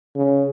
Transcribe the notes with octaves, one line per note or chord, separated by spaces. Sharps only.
C#3